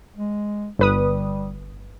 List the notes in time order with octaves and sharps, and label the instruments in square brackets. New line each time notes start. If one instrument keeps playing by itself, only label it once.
[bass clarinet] G#3
[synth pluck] G1 B4 D#6 [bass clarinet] G3